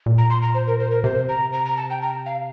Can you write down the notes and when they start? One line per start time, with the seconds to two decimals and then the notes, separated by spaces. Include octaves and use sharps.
0.06 A#2
0.18 A#5
0.30 C6
0.42 A#5
0.54 C5
0.67 A#4
0.80 C5
0.91 A#4
1.04 C3 C5
1.29 A#5
1.53 A#5
1.65 A#5
1.77 A5
1.90 G5
2.02 A#5
2.26 F5